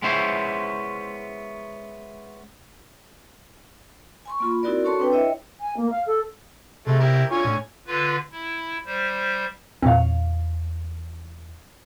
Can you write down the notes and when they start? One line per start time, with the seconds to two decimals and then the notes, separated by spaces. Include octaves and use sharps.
0.02 G#3 B3 C#4 E4 C5
4.26 G#5 C6 C#6
4.40 A#3 F4 B5
4.63 C4 D#4 E4 F#4 A#4 D5
4.84 C#4 F#4 A4 C#5 A5 C6
4.99 C4 D4 B4 G5
5.12 E4 C#5 D#5 E5 G5
5.61 G#5
5.77 A#3
5.91 F5
6.07 A4
6.87 C3 G#3 A3
7.00 E4 G4 A#4
7.31 D3 F4 C#5 G#5
7.45 A2
7.87 D3 F4 B4
8.32 E4
8.86 G3 C5
9.82 E2 A#2 C4 C#5 F5